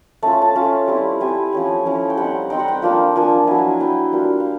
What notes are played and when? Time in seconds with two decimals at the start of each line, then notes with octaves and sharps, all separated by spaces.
0.23 A3 C#4 F4 A5
0.42 A5
0.56 A3 C#4 F4
0.88 G3 C4 E4
1.20 G3 C4 E4 G#5
1.53 F3 A3 C#4 E4 G#5
1.85 F3 A3 C#4 E4
2.10 G5
2.17 G3 C4 D#4 F#5
2.50 G3 C4 D#4 G5
2.59 F#5
2.68 G5
2.82 F3 A#3 D4 F4
3.15 F3 A#3 D4 F4 G#5
3.47 F#3 B3 E4 G#5
3.80 F#3 B3 E4 G5
4.13 G3 A#3 D4 F4
4.40 F5